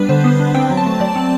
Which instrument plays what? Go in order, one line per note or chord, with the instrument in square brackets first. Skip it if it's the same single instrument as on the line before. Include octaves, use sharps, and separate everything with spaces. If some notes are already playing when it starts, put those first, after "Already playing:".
Already playing: [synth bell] G3 B3 D4 B4
D3 C5
B3
D4
C4 G5
F#3
A5
A3
F#3 D5
C4